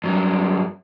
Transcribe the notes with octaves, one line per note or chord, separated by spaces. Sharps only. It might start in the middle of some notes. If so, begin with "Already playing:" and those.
G2 F#3